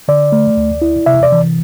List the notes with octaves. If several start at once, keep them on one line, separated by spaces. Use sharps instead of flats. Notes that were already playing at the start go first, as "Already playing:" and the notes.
D3 D5
A3
D2
E4
C3 E5
D5
E3